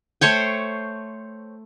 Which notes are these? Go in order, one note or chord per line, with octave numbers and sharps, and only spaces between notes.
A3 C5 C#5 G5